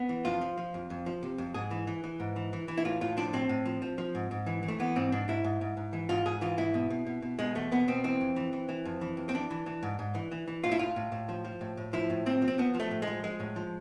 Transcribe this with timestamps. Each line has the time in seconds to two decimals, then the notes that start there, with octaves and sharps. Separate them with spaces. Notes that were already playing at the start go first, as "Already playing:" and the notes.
Already playing: B3
0.09 E3
0.25 F2 F4
0.41 F3
0.57 F3
0.74 F2
0.90 F2
1.06 F3
1.23 C3
1.38 F2
1.54 G#2 G#4
1.71 E3
1.87 E3
2.04 E3
2.20 G#2
2.36 E3
2.53 E3
2.68 E3
2.77 E4
2.85 A2 F4
3.01 A2 F4
3.17 F3 D4
3.33 A2 C4
3.49 A2
3.66 F3
3.82 F3
3.98 F3
4.15 G#2
4.31 G#2
4.46 E3
4.63 E3
4.68 A3
4.80 E3 B3
4.96 G#2 C4
5.12 G#2 D4
5.28 G#2 E4
5.44 G#2
5.61 G#2
5.77 G#2
5.93 E3
6.09 G#2 F4
6.26 G#2 G#4
6.41 E3 F4
6.57 G#2 E4
6.74 B2
6.90 B2
7.07 B2
7.22 B2
7.39 B2 G#3
7.55 E2 A3
7.72 B2 B3
7.88 B2 C4
8.04 E3 C4
8.21 F2
8.36 E3
8.53 E3
8.69 E3
8.85 F2
9.01 E3
9.17 F2
9.29 C4
9.34 E3 D4
9.50 E3
9.66 E3
9.83 G#2
9.99 G#2
10.15 E3
10.32 E3
10.48 E3
10.64 A2 F4
10.71 E4
10.79 A2 F4
10.96 A2
11.12 A2
11.29 F3
11.44 F3
11.61 A2
11.77 A2
11.93 F3 E4
12.10 A2
12.26 F3 C4
12.42 F3
12.48 C4
12.58 F3 B3
12.74 F3
12.80 A3
12.91 A2
13.02 G#3
13.07 F3
13.23 F3 G#3
13.40 A2
13.56 F3